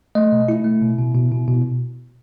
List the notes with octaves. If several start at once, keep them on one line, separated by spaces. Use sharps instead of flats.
A3 D#5
B2
A3 E4
A3
B2
B2
B2
B2
B2